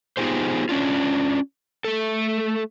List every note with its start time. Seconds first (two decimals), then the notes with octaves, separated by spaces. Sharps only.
0.17 B3 D#4 F4 G4 G#4 C5
0.69 C#4 D4 F4
1.84 A3 A4